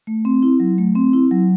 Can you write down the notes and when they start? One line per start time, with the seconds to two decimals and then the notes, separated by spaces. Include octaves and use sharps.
0.07 A3
0.25 C4
0.43 E4
0.60 F#3
0.78 A3
0.95 C4
1.13 E4
1.31 F#3